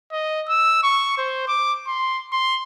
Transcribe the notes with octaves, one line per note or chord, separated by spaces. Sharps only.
D#5
E6
C#6
C5
D6
C6
C6